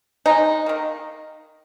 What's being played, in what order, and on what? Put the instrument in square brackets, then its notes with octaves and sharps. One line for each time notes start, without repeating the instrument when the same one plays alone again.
[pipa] C#3 G#3 D#4
D#3 A#3